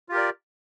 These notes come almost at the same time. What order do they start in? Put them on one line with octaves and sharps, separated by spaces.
F4 G4 A#4 D5